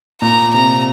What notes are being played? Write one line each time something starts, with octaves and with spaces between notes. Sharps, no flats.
A#2 A#5
C3 A#5